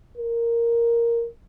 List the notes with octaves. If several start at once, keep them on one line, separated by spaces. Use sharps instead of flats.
A#4